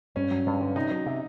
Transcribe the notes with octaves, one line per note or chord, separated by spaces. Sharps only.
G2 C#4
F#3
G2
D3
C3 D#4
F#3
C3